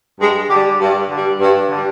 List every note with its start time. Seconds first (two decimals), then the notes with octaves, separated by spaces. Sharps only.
0.20 G2 G#3
0.50 D3 G3 G4
0.80 G2
1.10 D3 G3
1.40 G2
1.70 D3 G3